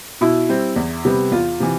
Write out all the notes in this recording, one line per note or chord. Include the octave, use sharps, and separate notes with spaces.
B2 E4
G3 C4
E2
C3 G3 B3
E2 F4
C3 E3